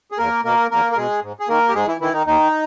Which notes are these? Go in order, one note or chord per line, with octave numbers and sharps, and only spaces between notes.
G#4
E2 A#3 A#4
B2 A#3 A#4
E2 A#3 A#4
A#4
B2 G#3 G#4
G#2
G#4
D#3 A#3 A#4
G4
G#2 G#3 G#4
E3 E4
D#3 E3 E4
D#3 D#4
D#2 D#3 D#4